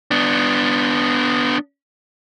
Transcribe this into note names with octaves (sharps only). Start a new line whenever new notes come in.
B3 D4